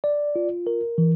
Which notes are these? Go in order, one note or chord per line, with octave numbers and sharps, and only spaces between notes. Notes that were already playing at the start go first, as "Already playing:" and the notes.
D5
F4
A#4
E3